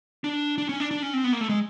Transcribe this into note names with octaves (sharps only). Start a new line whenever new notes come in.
D4
D4
C#4
D4
D4
C#4
C4
B3
A#3
A3
G#3